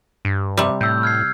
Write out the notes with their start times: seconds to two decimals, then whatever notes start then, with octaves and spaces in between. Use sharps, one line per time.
0.25 G2
0.57 C3 G3
0.81 A2 E6 G6
1.03 F6 G#6 C7